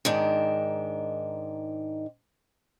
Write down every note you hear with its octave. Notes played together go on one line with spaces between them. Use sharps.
G#2 D#3 D4